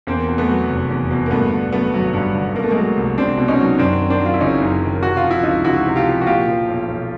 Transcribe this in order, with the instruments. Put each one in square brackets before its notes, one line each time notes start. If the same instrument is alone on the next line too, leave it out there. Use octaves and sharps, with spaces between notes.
[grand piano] E2 A#3 C4
B2
A3 B3
F#3
F1
E2
B2
A#3
G2 A3 B3
D3
F#3 A3 B3
G#1 F#3
G2
D3
B2 A#3
A3
F#3 G#3 A#3
C2
C2 C4 D4
B2
C#4 D#4
F#3
F#2 C4 D4
D#3
C4 D4
F#3
F4
E4
F#1 C#4 D#4
F#2
D#3
C3 F#4
F4
F3
E4
C#2 D#4 F4
C#2 E4 F#4
C3
F4 G4
F3
F#4
A#2 F4 G4
F3
B1
B1